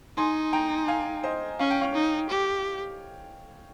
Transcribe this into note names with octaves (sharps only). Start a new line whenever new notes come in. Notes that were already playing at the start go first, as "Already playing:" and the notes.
D#4 G#5 C6
G5 A#5
F5 G#5
C5 D#5
C#4 F5
G5
C#5 F5
D#4
G4